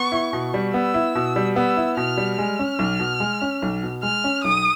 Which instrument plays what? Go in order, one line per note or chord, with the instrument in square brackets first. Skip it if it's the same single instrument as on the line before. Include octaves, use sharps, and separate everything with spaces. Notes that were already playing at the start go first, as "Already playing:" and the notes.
Already playing: [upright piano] B3 [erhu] C#6
[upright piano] E4
B2
G3
[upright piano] B3 [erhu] E6
[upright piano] E4
B2
G3
[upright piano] B3 [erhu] E6
[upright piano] E4
[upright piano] B2 [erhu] F6
[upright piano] G3
[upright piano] G#3 [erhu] F6
[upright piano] C#4
B1
B2
G#3
C#4
B1
B2
[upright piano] G#3 [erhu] F6
[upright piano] C#4
[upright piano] B1 [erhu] D#6